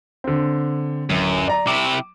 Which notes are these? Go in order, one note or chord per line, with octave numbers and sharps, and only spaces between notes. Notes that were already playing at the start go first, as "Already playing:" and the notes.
D3 C4
D1 F#2
D5 A#5
C3 E4 D6